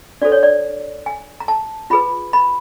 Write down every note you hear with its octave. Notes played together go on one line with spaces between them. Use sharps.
D4 F#4 A4 C5 D5
C#5
D5
G#5
A#5
A5
F4 G#4 B4 B5
B5